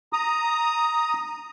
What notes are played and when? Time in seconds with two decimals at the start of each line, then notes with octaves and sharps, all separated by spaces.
0.13 A#5 D#6